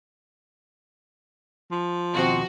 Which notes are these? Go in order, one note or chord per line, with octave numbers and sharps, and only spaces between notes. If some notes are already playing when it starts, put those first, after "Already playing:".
F3
D#2 B2 C4 F#4